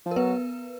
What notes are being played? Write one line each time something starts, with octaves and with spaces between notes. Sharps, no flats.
F3
A#4
F#3 B3 B4